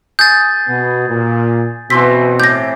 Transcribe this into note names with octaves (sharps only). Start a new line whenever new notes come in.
G#4 G6 A6
B2 B3
A#2
B2 E3 C4 C6 E6 B6
A2 G4 G6 A#6